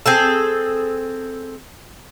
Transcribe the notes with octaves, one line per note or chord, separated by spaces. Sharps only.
C4 G#4 A4